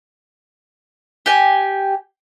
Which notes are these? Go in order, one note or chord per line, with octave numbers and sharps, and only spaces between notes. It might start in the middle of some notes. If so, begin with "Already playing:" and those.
G4 G#5